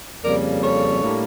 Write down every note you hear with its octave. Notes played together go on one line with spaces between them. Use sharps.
F2 C#3 G3 A#3 A#4 D5
A4 C#5
A2 G3 A#3 D4